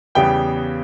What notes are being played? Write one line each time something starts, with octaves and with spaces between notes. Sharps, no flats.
E2 C#3 G3 B3 G5